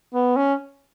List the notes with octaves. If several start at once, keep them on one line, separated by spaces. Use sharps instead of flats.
B3
C#4